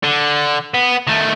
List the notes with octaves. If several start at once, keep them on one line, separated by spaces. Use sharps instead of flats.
D3
B3
D#3 A3